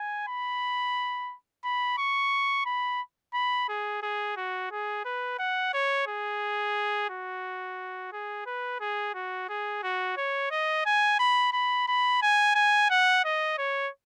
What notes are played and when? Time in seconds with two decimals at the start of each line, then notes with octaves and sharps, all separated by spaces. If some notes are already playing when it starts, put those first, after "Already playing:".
Already playing: G#5
0.27 B5
1.64 B5
1.98 C#6
2.66 B5
3.34 B5
3.69 G#4
4.02 G#4
4.37 F#4
4.72 G#4
5.05 B4
5.39 F#5
5.74 C#5
6.07 G#4
7.10 F#4
8.12 G#4
8.46 B4
8.80 G#4
9.14 F#4
9.49 G#4
9.83 F#4
10.17 C#5
10.51 D#5
10.86 G#5
11.19 B5
11.53 B5
11.88 B5
12.22 G#5
12.55 G#5
12.90 F#5
13.25 D#5
13.58 C#5